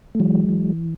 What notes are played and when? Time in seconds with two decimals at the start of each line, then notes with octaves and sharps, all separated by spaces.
0.15 A3
0.20 E3 F#3 G#3
0.49 E3